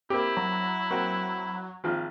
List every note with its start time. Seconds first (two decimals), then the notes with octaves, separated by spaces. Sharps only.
0.10 A#3 C4 E4 G4
0.37 F#3 A#5
0.91 A#3 C4 F#4
1.84 G#1 F3 F4